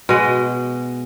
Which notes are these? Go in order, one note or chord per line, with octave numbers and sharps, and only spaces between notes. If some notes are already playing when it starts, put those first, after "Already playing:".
B2 G#3 D#5